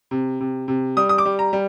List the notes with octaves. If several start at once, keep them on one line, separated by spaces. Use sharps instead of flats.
C3
C3
C3
G3 D#6
D#6
D6
G3
A#5
G3